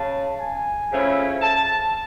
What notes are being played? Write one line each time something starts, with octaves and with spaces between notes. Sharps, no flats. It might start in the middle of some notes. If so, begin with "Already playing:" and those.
Already playing: C#3 A5
G#5
C#3 F3 A3 C#4 E4
A5